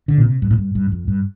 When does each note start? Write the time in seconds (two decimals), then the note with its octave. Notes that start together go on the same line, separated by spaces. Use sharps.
0.08 D3
0.18 A#2
0.24 C3
0.42 G2
0.51 A2
0.58 G2
0.75 G2
0.92 F2
1.08 G2